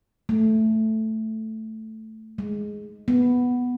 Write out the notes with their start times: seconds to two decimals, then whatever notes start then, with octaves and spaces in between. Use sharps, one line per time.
0.29 A3
2.38 G#3
3.08 B3